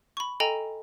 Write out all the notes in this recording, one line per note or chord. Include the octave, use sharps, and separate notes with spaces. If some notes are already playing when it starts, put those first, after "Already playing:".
B5 C#6
A4 D#5 G5 G#5 A#5